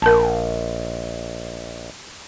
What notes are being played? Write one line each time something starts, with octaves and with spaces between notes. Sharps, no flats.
A#1 A#4 A5